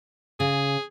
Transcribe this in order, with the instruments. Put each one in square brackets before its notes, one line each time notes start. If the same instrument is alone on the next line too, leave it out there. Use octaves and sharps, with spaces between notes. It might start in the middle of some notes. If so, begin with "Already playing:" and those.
[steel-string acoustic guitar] C#3 [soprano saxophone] G#4